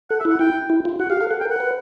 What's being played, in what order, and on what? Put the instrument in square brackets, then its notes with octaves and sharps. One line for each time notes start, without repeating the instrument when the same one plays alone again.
[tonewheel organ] A4 [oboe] F#5
[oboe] E5
[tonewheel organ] E4
[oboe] F#5
[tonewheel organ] E4 [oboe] G5
[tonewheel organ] E4
F4
[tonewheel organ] F#4 [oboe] F#5
[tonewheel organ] G4 [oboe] F5
[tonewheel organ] A4 [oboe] F5
[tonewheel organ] A4 [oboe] F#5
[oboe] G5
[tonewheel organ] A#4
[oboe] F#5
[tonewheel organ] B4